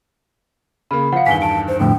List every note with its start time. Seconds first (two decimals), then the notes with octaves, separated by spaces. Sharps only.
0.91 C#3 A#3 B5
1.13 F3 F5 F#5 C#7
1.26 E2 G2 D#3 G#5 B6 G7
1.42 A5 D7
1.68 C5
1.80 F2 A2 D3 G5